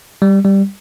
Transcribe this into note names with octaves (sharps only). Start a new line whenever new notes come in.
G3
G3